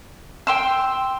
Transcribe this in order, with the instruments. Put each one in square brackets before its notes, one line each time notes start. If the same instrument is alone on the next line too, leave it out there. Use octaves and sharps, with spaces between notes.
[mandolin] G5 C6 E6